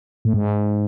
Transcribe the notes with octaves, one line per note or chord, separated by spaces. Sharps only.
A2
G#2